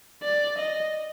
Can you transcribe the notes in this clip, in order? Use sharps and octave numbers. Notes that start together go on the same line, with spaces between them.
D5
D#5